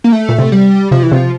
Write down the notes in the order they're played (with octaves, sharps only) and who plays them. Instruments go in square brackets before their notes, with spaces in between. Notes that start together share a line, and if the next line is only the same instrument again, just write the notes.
[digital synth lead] A#3
A3
[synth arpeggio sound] A#2
C3
[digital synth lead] G3
[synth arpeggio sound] C3 [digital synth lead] F3
[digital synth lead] E3
[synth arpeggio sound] C3 [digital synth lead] F3